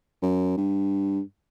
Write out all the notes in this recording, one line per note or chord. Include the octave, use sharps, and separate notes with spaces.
F#2
G2